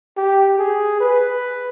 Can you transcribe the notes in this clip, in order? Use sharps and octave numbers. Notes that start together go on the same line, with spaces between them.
G4
G#4
B4